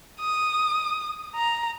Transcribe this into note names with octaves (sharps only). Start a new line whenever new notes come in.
D#6
A#5